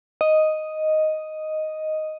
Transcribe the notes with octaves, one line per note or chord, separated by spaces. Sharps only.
D#5